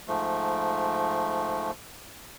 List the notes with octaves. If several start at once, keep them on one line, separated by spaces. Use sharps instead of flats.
G#2 F3 A3